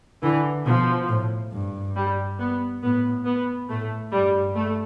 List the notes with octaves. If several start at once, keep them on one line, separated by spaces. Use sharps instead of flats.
D3 E3
B2 F3
A2
G2
G3
B3
A2 B3
B3
A2 A3
G2 G3
A3